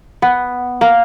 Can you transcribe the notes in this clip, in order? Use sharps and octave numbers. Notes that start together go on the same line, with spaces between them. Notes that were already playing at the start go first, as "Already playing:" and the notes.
B3
A#3